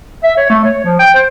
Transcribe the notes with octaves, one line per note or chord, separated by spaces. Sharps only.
E5
C#5
A3
C#5
F3
G5
C5